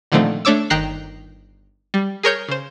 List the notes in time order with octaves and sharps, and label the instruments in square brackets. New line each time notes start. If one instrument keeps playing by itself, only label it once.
[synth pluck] A#2 D3 D#3 F3 A3 C4
A3 D4 C#5 D6 E6
G1 D#3 G5 A#5 F#6 C7
G3
G#4 A#4 C#5 G6
C#3 C5